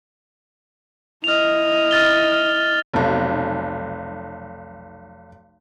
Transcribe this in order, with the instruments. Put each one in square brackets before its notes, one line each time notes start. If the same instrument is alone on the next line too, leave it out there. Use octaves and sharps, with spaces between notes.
[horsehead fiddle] E4 D#5 [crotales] F6 F7
[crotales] F6 A6 G7
F6
[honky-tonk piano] F1 B1